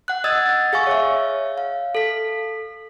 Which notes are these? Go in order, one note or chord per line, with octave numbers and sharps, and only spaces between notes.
F#5 F#6
D#5 F#5 D#6 E6 G#6 A6
G#4 F5 G#5 C#6
C#5 E5
F5
A4 B6